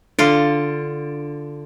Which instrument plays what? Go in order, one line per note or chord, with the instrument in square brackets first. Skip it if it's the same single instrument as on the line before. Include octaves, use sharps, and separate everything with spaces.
[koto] D3 F4 [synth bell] D4